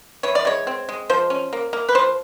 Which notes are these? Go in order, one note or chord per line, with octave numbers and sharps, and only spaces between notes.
E3 C#5
D5
G#3 C#5
C4
G#3
F3 C5
C#4
A#3
A#3
B4
F3 C5